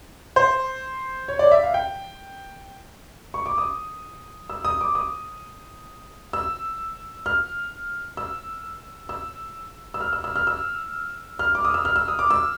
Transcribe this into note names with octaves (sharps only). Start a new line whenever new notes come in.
C5
C#5
D5
E5
F5
G5
C#6
D6
D#6
E6
D#6
D6
D#6
E6
F6
E6
E6
E6
F6
E6
E6
F6
E6
F6
D6
D#6
E6
F6
E6
D#6
D6
E6